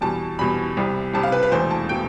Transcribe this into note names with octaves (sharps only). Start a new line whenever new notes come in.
E2 B2 G3 A5
E2 B2 G3 B5
C2 C3 G3
C2 C3 G3 A5
F5
B4
B4
E1 E2 B2 A3 C5
A5
B2 A3 G5